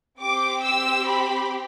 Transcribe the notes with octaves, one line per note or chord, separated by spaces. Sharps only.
C4 G4 D6
E6
B5